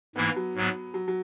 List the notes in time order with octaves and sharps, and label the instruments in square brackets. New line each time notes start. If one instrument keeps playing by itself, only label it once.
[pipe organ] G#2 E3 A#3 E4 [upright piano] B3
[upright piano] F#3
[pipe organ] G#2 F#3 B3
[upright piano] F#3
F#3